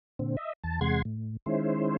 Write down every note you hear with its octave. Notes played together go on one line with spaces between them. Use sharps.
A#2 D3 C4
D#5 E5
E2 A5
E2 C3 G#3 F#5 C6 G#6
A2
D#3 G#3 C#4 E4 C5